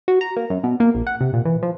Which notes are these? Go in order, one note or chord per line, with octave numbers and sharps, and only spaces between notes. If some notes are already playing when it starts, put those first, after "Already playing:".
F#4
A#5
A#3
F#2
B2
A#3
A#1
F#5
C3
A#2
E3
F3